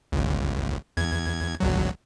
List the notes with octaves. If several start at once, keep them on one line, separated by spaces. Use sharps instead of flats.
G1 C#2
E2 G#6
G#1 D2 F#3